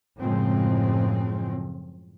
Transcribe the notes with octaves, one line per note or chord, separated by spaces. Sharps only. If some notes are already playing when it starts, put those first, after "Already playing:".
F#2 A2 C#3 F3 G#3 C4